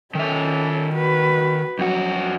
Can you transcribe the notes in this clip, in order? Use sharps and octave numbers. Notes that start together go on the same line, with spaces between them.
D#3 C#4 A4 E5
F#4 B4
F2 F#3 F#4